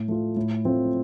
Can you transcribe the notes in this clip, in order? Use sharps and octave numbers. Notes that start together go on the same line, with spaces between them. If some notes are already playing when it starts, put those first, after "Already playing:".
Already playing: A2
A3 F4
A2
A3 C4 F4